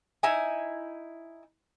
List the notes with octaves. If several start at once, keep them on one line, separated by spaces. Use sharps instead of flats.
D#4 E4 G#5